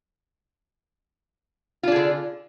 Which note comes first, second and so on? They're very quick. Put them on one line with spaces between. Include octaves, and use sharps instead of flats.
F4 D4 G#4 D3